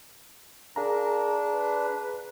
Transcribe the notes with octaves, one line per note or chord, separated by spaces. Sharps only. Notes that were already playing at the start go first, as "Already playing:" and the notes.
D4 G#4 A#4 F5 A#5
B4